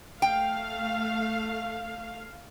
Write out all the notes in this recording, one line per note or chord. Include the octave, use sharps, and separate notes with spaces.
A3 F5 G5